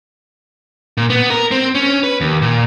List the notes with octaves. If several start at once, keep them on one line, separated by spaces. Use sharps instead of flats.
A#2
B3
A#4
C4
C#4
B4
D#2
A#2